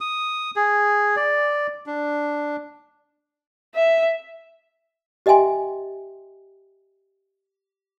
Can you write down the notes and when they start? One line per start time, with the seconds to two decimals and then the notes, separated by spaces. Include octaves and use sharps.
0.01 D#6
0.56 G#4
1.16 D5
1.86 D4
3.75 E5
5.26 G4 D#5 E5 G5 G#5 C6